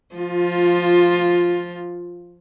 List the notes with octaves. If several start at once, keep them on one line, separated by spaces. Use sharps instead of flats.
F3 F4